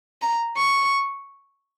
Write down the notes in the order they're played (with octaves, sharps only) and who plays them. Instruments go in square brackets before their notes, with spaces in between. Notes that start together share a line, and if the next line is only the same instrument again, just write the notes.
[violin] A#5
C#6